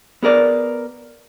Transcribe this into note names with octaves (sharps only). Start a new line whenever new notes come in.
B3 G#4 A#4 D5